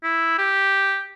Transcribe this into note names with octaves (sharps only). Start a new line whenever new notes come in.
E4
G4